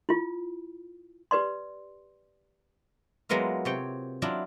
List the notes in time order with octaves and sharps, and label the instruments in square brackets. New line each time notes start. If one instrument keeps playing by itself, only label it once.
[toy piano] E4 F4
G4 B4 D5 C6
[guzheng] F#3 G#3 A#3 B3 E4 F4
C3 C#5 G5
F#3 D4 E4 F4